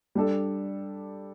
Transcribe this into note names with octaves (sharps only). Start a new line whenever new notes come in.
G3 D4 A4